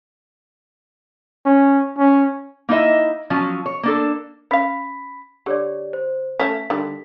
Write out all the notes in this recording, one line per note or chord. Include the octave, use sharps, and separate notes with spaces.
C#4
C#4
A#3 D#4 E4 D#5 E5
F3 F#3 C#4
C#5
A#3 D4 A4
C#4 F5 B5 B6
D3 G4 C#5 D5
C5
A3 A#3 C#4 B6
D3 D#3 G3